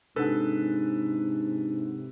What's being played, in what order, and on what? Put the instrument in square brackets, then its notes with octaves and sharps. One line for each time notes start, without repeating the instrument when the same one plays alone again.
[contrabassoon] G#2 [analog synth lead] C3 [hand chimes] D4 F#5 [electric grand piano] A4 B4